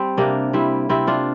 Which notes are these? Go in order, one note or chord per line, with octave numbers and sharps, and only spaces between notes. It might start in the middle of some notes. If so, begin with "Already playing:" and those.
Already playing: G3 C4
C3 A#3 D4
G3 C4 E4
C3 C4 E4
D4 F4